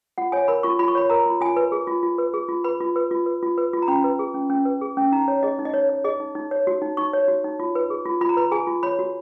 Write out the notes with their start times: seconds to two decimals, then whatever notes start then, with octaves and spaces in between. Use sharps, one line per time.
0.18 F4 F#5
0.32 C#5 G#5
0.48 A#4 B5
0.63 F4 C#6
0.79 F4 B5
0.88 C#6
0.95 C#5 B5
1.10 A#4 A#5
1.26 F4
1.41 F4 G#5
1.56 B4
1.72 G#4
1.87 F4
2.03 F4
2.18 B4
2.34 G#4
2.49 F4
2.64 B4 B5
2.80 F4
2.96 B4
3.11 F4
3.26 B4
3.43 F4
3.58 B4
3.73 F4
3.82 A#5
3.88 C#4 B5
4.04 B4
4.19 G#4
4.34 C#4
4.50 C#4
4.65 B4
4.82 G#4
4.97 C#4
5.12 D#4 A#5
5.28 C#5
5.43 G#4 D#5
5.59 D#4
5.65 D#5
5.73 D#4 C#5
5.89 C#5
6.04 G#4 D#5
6.20 D#4
6.35 D#4
6.51 C#5
6.67 F#4
6.82 D#4
6.97 D#4 C#6
7.13 C#5
7.28 F#4
7.44 D#4
7.60 F4
7.75 B4
7.90 G#4
8.06 F4
8.21 F4 B5
8.29 A#5
8.37 B4 B5
8.51 G#4 G#5
8.67 F4
8.83 C#5 B5
8.99 F#4